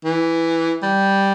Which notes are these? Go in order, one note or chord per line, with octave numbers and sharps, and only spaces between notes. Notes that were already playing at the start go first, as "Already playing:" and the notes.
E3
G3